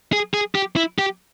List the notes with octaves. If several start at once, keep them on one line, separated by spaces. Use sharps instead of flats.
G#4
G#4
G4
E4
G4